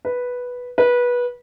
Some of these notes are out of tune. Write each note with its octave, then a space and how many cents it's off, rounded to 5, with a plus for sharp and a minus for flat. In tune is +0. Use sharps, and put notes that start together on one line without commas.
B4 -5
B4 -20